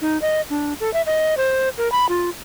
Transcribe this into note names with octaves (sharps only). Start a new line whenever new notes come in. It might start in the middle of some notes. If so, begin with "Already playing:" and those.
D#4
D#5
D4
A4
E5
D#5
C5
A#4
B5
F4